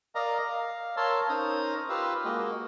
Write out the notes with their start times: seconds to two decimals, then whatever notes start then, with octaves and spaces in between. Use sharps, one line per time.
0.15 A#4 D5 D#5 F5 A#5
0.48 F5
0.97 A#4 C#5 F5 A5 C6 E6
1.29 C#4 D#4 A#4 C5 A#5 D#6
1.89 F4 G4 B4 F5 E6
2.25 G#3 A#3 F#4 D#5